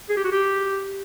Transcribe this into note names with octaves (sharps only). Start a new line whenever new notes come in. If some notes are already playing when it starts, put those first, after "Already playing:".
G#4
G4
F#4
G4